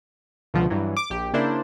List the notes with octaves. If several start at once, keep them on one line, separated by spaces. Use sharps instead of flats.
C#2 B2 D3 F3
G2 E3 F#3
D6
A#1 G4
C#3 A#3 D4 E4 C5